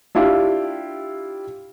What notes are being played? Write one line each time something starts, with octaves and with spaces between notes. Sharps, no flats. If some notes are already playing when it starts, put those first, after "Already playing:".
D4 E4 F4 G4